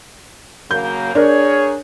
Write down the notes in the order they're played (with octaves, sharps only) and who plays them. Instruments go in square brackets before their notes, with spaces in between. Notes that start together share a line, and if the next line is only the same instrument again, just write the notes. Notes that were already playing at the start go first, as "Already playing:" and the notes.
[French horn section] C#3 F#3 A#3 [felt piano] G6
[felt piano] D4 A#4 [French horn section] G#4 C#5